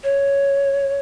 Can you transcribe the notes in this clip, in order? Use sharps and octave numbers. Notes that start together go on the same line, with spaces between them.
C#5